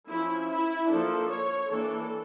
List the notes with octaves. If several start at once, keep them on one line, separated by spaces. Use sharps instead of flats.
F3 C#4 E4
E4
F3 A#3 D4 A4
C#5
E3 A#3 D4 A4